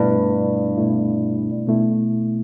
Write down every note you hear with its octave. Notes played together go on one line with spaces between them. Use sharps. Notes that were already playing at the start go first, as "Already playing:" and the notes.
Already playing: G2 B2 A3 E4
B2 A3 E4
B2 A3 E4